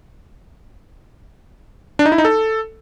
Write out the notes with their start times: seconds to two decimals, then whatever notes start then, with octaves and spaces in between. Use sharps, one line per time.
1.99 D4
2.06 D#4
2.12 E4
2.18 D#4
2.25 A4